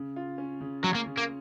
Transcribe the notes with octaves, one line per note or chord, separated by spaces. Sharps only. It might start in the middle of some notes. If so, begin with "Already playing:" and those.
Already playing: C#3
F4
C#4
C#3
F#3 C#4
A#3
C#3
A#3